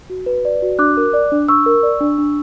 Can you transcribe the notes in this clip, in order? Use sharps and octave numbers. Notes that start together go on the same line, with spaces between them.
F#4
B4
D5
F#4
D4 D6 F#6
A#4
D5
D4
D4 C#6 E6
A#4
D5
D4
D4